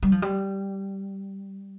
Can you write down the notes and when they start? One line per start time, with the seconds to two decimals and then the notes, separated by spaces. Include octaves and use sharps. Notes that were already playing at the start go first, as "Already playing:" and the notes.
0.03 G3
0.12 F3
0.22 G3